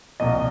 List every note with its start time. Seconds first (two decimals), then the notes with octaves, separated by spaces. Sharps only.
0.20 C2 A#2 F3 C4 D#5